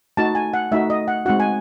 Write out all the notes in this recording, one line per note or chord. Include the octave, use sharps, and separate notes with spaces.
A3 D#4 F#4 A5
G#5
F#5
A3 D#4 F#4 E5
D#5
F#5
G#3 C4 D#4 F#4 F#5
G#5